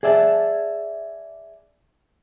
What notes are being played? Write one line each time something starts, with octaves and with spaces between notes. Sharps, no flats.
G#4 D5 E5 G#5 A5